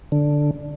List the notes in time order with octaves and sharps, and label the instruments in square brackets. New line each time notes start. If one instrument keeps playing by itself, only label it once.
[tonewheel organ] D3